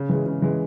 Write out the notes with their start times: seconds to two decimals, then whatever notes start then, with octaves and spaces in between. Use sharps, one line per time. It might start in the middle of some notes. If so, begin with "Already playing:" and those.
Already playing: C#3
0.09 E3 G#3
0.26 C#3
0.42 E3 G#3